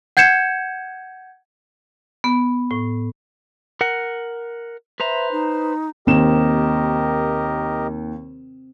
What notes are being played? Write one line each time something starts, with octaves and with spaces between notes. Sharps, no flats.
F#5 G6 G#6 C#7 E7
B3
A2
A#4 F#5
B4 C5 E5 A#5
D#4
D#2 C4 G4 A#4 D#5 E7